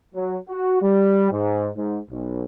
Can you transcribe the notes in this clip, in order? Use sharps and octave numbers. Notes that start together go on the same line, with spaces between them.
F#3
F#4
G3
G#2
G#2
B1